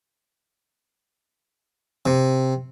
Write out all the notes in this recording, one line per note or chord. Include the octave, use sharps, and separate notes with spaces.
C3